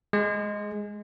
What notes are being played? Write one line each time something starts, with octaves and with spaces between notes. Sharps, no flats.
G#3